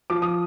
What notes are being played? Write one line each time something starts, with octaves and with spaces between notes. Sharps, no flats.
F3 D6
D#6